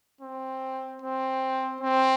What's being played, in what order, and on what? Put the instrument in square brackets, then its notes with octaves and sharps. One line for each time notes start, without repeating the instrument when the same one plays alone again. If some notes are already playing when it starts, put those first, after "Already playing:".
[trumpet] C4
C4
C4